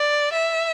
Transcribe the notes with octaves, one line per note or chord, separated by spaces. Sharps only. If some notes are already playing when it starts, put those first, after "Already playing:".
Already playing: D5
E5